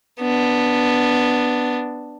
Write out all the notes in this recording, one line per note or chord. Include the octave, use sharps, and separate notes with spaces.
B3 D4